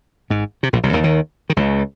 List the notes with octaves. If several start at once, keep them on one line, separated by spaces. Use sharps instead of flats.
G#1 G#2
C3
A#1 A#2
C2 C3
D#2 D#3
D#2 D#3
D#3
C#2 C#3